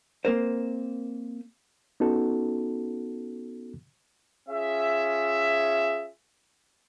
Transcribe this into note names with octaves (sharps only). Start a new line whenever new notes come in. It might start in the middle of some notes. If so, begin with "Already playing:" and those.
A#3 C4 A#4 C5
B3 C#4 D#4 F#4 A4
C#4 F4 G#4 E5